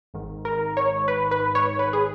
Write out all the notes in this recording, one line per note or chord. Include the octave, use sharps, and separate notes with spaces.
G#1 G#2 D#3
A#4
C#5
B4
B4
C#5
B4
G#4